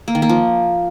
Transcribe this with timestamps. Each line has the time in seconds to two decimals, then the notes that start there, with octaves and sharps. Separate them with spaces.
0.08 A#3
0.15 D#3
0.22 A#3
0.29 F3